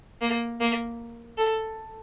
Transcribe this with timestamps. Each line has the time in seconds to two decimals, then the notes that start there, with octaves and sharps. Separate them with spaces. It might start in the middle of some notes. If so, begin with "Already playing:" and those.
0.21 A#3
0.61 A#3
1.37 A4